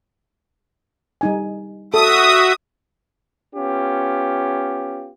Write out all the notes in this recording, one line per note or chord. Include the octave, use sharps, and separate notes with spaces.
G3 D#4 G#5
F#4 A4 E5 D#6
B3 C#4 F4 G4